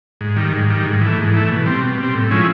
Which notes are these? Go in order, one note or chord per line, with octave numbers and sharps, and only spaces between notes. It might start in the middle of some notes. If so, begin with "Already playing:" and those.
G#2
D#3 G3
G#2
D#3 G3
G#2
E3 A3
G#2
E3 A3
B2
G3 C4
B2
G3 C4
A2
F3 G#3 C#4 E4